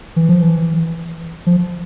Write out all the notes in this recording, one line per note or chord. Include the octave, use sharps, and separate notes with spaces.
E3
F3
E3
F3